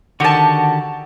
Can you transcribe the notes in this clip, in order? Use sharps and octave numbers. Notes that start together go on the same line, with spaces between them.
D3 D#3 F#4 G4 A5